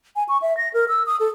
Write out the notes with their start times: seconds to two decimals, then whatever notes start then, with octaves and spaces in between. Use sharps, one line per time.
0.16 G#5
0.29 C#6
0.42 E5
0.57 A#6
0.73 A#4
0.88 E6
1.06 D#6
1.20 A4